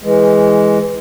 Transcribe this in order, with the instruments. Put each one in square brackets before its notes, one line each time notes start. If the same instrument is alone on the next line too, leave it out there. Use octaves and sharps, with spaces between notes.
[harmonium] E3 G#3